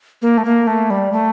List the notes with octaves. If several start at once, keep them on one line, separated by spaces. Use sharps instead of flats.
A#3
A3
A#3
A3
G3
A3